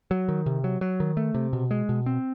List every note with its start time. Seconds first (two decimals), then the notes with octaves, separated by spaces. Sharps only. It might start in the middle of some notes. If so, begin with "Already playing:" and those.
0.11 F#3
0.28 D#3
0.46 C3
0.64 F#3
0.81 F#3
1.00 D#3
1.17 A3
1.34 C3
1.53 B2
1.71 G#3
1.89 B2
2.06 C4